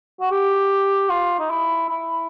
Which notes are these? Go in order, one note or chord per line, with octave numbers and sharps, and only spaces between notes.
F#4
G4
F4
D#4
E4
E4